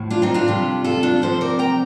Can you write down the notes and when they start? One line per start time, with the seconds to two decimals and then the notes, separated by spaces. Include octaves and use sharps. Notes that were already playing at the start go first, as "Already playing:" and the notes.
Already playing: A2 F3
0.10 D4 F4
0.22 C4 D#4
0.34 D4 F4
0.48 F2 C3 G3
0.84 F4 A4
1.03 D4 F4
1.22 C3 F3 C4 A4 C5
1.41 A#4 D5
1.59 G5 A#5